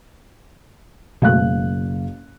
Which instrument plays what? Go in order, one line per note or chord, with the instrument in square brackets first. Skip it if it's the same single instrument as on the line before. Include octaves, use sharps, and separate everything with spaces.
[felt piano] F#1 F5 F#6 [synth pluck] B2 G#3 A3